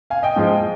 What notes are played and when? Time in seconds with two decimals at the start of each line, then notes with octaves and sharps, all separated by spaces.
0.10 F5 G#5
0.23 D#5 G5
0.36 G#2 F3 G#3